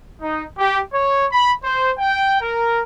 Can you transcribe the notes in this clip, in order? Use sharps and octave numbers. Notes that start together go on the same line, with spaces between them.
D#4
G4
C#5
B5
C5
G5
A#4